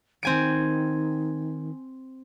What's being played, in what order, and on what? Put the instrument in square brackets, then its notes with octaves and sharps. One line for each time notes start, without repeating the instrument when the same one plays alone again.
[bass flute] D#3 [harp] C4 G#5 D7